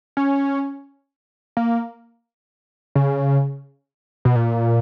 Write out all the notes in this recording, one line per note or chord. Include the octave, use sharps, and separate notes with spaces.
C#4
A#3
C#3
B2
A#2